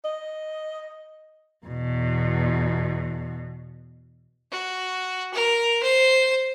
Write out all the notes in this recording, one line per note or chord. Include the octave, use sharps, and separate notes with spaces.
D#5
E2 B2
F#4
A#4
C5